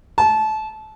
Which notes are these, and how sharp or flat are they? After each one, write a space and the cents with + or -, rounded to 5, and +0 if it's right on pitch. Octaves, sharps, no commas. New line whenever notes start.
A5 -25